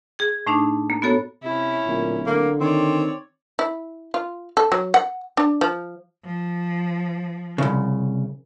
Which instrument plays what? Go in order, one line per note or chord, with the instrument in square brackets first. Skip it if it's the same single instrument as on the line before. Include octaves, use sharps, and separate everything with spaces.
[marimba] G#4 G#6
A2 A3 D4 D#4
A#3
B3 F#4 A4 C#5
[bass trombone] C3 [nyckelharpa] C#4 E4
[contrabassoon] D1 [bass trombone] A#2
[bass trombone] D3 [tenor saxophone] A#3
[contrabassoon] D#3 [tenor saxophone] C4 [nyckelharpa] C#5 D5
[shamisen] E4
F4
A4
F#3
F#5
D4
F3
[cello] F3
[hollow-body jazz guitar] C2 C#3